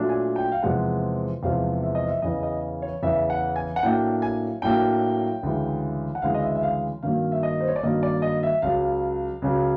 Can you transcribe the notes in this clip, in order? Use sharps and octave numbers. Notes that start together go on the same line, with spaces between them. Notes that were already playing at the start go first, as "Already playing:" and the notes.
Already playing: A#2 F#3 A3 D4
G#5
G5
F5
E2 C3 F3 G#3 F#5
E2 C3 F3 G#3 F5
E5
D#5
E5
E2 C#3 E3 D#5
D#5
C#5
E2 C#3 E3 E5
F#5
G#5
F#5
A2 F#3 A#3 D4 G5
G#5
A2 F#3 A#3 D4 G5
D2 C#3 E3 G#3
F#5
D2 C#3 E3 G#3 F5
D#5
E5
E5
F5
G2 D#3 F#3 A#3 F5
E5
D#5
C5
C#5
D5
G2 D#3 F#3 A#3 D#5
D5
D#5
E5
C#2 C#3 F#3 F5
C#2 C#3 F#3